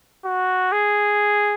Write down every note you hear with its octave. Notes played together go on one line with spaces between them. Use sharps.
F#4
G#4